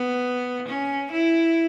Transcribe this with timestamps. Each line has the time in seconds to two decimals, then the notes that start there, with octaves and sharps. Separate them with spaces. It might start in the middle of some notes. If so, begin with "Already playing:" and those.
Already playing: B3
0.68 C#4
1.12 E4